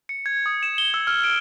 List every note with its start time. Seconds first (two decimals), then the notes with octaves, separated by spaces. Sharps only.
0.09 C#7
0.26 G#6
0.46 D#6
0.63 E7
0.78 G7
0.94 E6
1.07 F6
1.24 D7